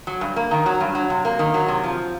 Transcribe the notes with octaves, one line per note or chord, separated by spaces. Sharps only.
F#3
G2
A#3
D#3
F#3
G2
F#3
C3
A#3
D#3
F#3
C3
F3